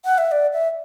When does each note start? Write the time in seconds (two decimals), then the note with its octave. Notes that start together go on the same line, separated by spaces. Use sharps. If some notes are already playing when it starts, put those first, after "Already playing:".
0.05 F#5
0.18 E5
0.32 D5
0.53 E5